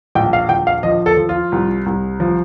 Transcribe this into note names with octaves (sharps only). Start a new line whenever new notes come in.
A#1 G5
F5
A#1 G5
F5
F3 D#5
A4
F3
F4
C2
C2
F3